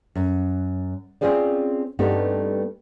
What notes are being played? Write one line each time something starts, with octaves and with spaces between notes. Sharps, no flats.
F#2
C4 C#4 F4 G#4 C5 D5
G2 A3 B3 C4 D#4 G4